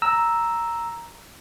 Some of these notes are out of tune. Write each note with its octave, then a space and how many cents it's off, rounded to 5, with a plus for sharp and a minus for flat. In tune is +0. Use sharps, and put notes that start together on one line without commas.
A#5 +0 E6 +0